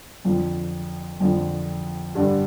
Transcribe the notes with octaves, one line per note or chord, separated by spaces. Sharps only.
F2 D3 F3
F2 D3 F3
G2 D3 G3